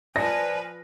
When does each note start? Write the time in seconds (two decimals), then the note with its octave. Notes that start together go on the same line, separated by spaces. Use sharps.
0.16 F3 B4 D5 G#5 A5 A#6